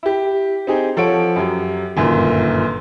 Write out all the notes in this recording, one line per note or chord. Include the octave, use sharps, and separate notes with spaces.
E4 G4
C4 D#4 G4 G#4
F3 A4 C#5 F#5 D7
F#2 F#3 G4
G1 F#2 A#2 D#3